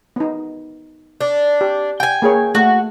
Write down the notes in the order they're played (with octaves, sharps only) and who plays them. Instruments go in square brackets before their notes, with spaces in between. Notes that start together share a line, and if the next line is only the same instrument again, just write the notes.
[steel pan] B3 D#4
[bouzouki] D4
[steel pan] G4
[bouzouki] G5 G#5
[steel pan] A#3 G#4 C#5
[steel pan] A3 [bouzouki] F#4